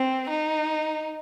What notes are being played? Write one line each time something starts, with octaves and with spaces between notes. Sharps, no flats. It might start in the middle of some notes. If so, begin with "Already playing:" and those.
Already playing: C4
D#4